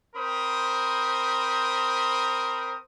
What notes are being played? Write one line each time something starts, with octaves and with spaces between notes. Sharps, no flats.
C4 A#4 C5 B5 D#6